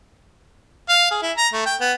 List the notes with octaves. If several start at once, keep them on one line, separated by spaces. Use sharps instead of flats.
F5
G#4
E4
A#5
A3
G5
B3